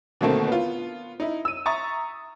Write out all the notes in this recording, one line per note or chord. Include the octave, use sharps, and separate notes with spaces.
B2 D3 D#3 A3 A#3 C4
B3 F4
D#4 E4
E6 D#7
E5 A#5 C#6 D#6 A6